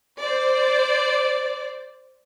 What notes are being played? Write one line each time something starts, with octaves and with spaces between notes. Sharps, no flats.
C5 D5